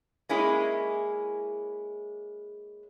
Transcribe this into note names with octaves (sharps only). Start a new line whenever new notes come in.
G#3 A#3 C#4 E4 G#4